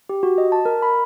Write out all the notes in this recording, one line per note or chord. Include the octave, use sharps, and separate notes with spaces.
G4
F#4
D#5
A5
A#4
B5